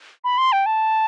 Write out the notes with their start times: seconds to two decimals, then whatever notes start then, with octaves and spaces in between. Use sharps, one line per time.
0.24 B5
0.38 C6
0.52 G5
0.66 A5